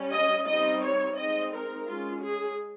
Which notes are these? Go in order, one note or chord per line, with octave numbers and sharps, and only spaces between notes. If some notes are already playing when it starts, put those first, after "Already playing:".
Already playing: G3 C#4
D#5
G3 C4 D#4 D#5
C#5
G#3 C4 D#4 D#5
A#4
G#3 C#4 F4
G#4